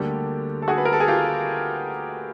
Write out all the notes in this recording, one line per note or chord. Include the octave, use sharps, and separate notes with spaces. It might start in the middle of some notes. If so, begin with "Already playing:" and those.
Already playing: D2 D3 G3 A#3 G4 A4
A4
F#4 G#4
B4
A#4
A4
G#4
F4 G4